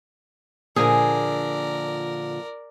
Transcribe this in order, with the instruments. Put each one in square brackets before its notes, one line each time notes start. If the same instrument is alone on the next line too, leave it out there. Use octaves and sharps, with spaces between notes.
[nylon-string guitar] A#2 D3 F3 [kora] G#4 [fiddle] A#4 D5